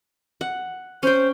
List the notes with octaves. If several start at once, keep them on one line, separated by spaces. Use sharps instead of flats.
F#5
C#4 C5 G5